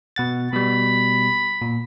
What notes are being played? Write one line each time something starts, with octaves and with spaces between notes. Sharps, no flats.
B2 F#5 A6
B2 G3 B5
A#2